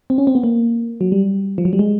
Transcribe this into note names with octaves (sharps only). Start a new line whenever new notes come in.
C4
C#4
C4
B3
A#3
F#3
G3
F3
F#3
G3
G#3